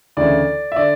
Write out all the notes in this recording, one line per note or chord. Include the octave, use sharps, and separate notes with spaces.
D2 C#3 E3 D5
E5
D3 D5